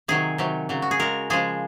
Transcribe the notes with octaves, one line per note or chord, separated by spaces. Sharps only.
C3 D#3 F#3 G#4
C3 D#3 F#3
C#3 F#3
F#4
G#4
C#3 G#3 A#4
C#3 F3 G#3 G#4